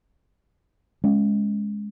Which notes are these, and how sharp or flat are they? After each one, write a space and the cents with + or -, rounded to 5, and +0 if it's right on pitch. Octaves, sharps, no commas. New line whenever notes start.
G#3 +0 C#4 +0